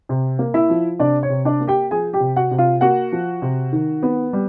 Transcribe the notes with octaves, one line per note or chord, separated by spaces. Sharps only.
C3
A#3
E4 E5
F3
C3 D4 D5
C#5
C3
D4 D5
A#3
G4 G5
F3 G#4 G#5
G4 G5
C3
F#4 F#5
C3
F4 F5
A#3 F#4 F#5
F3
C3
D#3
B3
G3